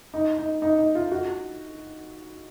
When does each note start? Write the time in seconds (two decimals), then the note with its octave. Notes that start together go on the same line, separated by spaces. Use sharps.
0.14 D#4
0.38 D#4
0.62 D#4
0.79 D#4
0.95 F4
1.12 F#4